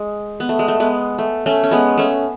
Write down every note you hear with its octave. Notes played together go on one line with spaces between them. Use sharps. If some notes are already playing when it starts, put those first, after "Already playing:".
Already playing: G#3
B3
A3
G#3
A3
G#3 B3
A3
A3 C#4
C#4
G#3 B3
A3 C#4